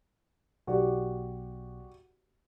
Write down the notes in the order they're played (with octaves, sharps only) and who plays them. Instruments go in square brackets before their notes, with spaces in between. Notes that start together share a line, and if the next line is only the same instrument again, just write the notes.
[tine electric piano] B1 [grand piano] F#4 G4 D5